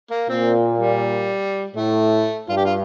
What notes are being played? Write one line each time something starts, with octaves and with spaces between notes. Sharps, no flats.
A#3
A#2 C4
G3
A2 A3
G2 F4
G4
F4